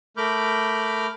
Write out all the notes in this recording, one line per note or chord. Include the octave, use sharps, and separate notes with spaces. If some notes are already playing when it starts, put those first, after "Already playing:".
A3 A#4 B5 D6 F6 G6